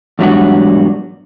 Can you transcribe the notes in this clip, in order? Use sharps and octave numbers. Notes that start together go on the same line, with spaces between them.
E2 G#2 F#3 G3 D4 F#5